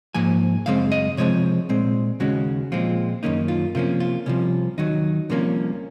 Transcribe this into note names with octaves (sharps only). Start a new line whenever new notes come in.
G#2 F3 A#3 G#5
F#2 C#3 G#3 C4 F5
D#5
C3 F3 G#3 C4 C#5
A#2 G#3 C4
D#2 C#3 G#3 C#4 F#4
A#2 F3 G#3 C4 F4
F#2 D#3 A#3 C#4 D#4
F4
C3 F3 A#3 C#4 F4
F4
C2 C3 F3 C#4
D#2 D#3 F#3 D#4
C2 C3 F3 A#3 C#4